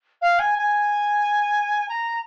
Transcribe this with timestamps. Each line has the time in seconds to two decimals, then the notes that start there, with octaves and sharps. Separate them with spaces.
0.21 F5
0.39 G#5
0.58 G#5
1.89 A#5